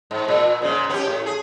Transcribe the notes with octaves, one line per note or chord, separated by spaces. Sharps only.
G#2
A#2
G#2 C#3
B3 C#4 G4
A2
G#4